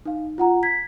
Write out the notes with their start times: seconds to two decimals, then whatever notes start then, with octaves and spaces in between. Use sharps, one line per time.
0.06 D#4 F5
0.38 F4 F#5 A#5
0.63 G#6 B6